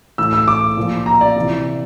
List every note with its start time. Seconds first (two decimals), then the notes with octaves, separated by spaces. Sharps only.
0.18 A2 E3 E6
0.33 E6
0.48 D6
0.77 A#2 F3
1.06 A#5
1.21 D5
1.36 C3 E3